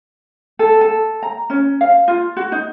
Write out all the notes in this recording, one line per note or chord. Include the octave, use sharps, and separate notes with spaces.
A4
A4
A#5
C#4
F5
F4
F#4
D#4